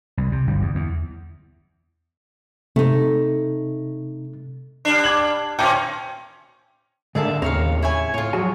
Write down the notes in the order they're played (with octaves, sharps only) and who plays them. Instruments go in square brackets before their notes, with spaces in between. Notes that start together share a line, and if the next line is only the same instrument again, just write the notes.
[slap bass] C2
C3
G1 D2 G3
E2
E2
[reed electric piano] C3 [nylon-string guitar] A3 D#4
[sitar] G3 D4
[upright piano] D6 G#6 F#7
[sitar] A2 C4 C#4 [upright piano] G5 A5 D6
[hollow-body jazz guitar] G#2 A3 A#3 [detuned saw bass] D3 [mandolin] G#4 E5 A5
[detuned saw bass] D#2 [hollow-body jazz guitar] A2 C#3 C4 [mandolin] A#4 C#5 F5
[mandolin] E4 C#5 G#5
[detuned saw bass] A2 [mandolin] F4 C#5
[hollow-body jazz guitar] F3 F#4 G#4 [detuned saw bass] F#3